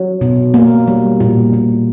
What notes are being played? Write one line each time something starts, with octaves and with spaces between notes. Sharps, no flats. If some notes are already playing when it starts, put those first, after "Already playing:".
Already playing: F#3
B2
A#3
G3
A#2
A#2